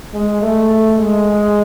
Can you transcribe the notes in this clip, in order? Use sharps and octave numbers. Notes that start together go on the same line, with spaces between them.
G#3
A3
G#3